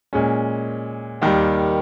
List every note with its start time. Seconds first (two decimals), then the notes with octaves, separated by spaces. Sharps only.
0.13 A#2 G#3 C#4
1.22 D#2 D#3 G3